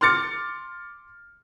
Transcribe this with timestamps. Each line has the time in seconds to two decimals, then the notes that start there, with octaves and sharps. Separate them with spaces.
0.01 C6 D6 F6 A6 C#7